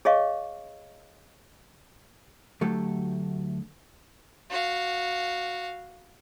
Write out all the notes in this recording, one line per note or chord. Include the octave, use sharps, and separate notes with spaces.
G#4 C#5 D#5 F5 C#6
D2 F#3 A3 G4 A4
F#4 F5